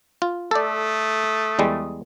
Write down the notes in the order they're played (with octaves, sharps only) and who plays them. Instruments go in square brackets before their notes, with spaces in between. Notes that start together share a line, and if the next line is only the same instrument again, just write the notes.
[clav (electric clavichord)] F4
[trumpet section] A3 D#6 [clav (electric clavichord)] A4 D5
[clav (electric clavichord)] E2 G3 G#3